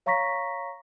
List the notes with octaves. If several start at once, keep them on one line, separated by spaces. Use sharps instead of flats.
C#5 F5 A#5 C#6 A#6 B6